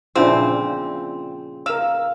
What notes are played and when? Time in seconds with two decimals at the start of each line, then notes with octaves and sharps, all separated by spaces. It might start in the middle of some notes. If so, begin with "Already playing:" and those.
0.15 A#2 C#3 F3 C4 D4 E4 E6
1.66 A#4 F5 E6